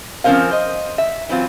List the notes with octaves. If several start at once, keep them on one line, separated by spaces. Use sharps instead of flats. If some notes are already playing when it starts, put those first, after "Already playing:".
F3 C4 C#4 A#4 C5 F5
C5 D#5
E5
E3 F#3 C4 F4